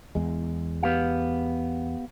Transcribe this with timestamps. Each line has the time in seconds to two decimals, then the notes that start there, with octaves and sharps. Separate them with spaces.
0.15 E2 G#3
0.83 B3 G4 F5